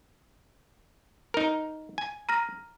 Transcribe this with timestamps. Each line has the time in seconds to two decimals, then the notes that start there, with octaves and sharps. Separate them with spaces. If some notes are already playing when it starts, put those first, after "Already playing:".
1.34 D#4 A#4
1.98 G#5
2.29 A#5 F6 A#6